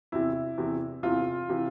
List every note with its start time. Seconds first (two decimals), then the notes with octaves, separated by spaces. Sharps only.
0.12 E2 C3 E3 E4
0.58 E2 C3 E3
1.03 E2 C3 E3 F4
1.50 C3 E3